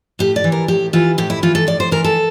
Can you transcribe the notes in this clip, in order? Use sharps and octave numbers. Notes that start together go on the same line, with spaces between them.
A2 G4
D5
E3
A#4
A2 G4
E3 F4
A2 G4
E4
E3 F4
A4
A2 D5
C5
E3 A#4
A4